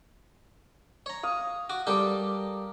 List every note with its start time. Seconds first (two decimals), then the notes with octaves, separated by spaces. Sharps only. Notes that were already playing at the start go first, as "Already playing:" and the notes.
1.06 C#5 A#5
1.23 F5 D#6
1.70 F#4 D6
1.87 G3 G4 A4 A#4 D6 D#6